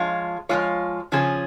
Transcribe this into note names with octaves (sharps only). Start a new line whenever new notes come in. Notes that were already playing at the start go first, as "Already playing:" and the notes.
Already playing: F3 G#3 F4 C#5
F3 G#3 F4 C#5
C#3 F3 C#4 G#4